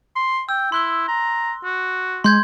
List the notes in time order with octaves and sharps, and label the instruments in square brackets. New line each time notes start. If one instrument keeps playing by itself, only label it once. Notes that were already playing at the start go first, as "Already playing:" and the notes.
[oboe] C6
[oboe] G5 [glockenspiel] E6
[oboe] E4 [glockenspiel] C6 F#6 G7
[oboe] A#5
F#4
[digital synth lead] G#3 [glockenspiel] C6 G6 G#6